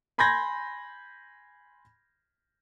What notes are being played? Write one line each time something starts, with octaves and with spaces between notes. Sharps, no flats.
G#5 B5 C6 G6 G#6 A#6